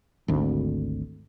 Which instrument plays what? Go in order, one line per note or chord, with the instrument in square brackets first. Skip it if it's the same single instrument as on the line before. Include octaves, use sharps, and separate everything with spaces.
[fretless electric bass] G#1 D2